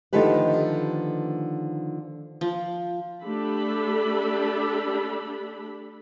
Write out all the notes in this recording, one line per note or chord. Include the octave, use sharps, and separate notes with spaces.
D3 D#3 F3 A3 G4 B4
F3
A3 D4 G4 A4 B5